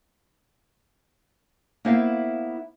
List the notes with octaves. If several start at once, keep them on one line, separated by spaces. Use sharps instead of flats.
A#3 B3 E4 C5 E5 F5